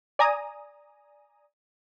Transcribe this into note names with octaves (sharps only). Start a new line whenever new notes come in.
D5 G#5 A#5 D#6